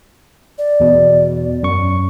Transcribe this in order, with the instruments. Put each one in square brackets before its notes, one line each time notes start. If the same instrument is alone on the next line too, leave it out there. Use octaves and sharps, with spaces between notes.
[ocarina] D5
[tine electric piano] E2 B2
F#2 C#6